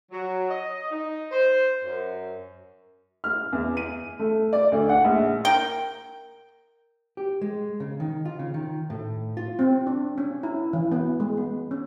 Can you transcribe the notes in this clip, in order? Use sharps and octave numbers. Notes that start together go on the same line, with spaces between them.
F#3
D#5
D#4
C5
F#2
F6
E2
D#7
A3
D5
D2
F#5
A#1
A#4 G5
G4
G#3
C#3
D#3
F4
C#3
D#3
A2
F4
C4
D4
C#4
E4
E3
B3
G#3
B3
C#4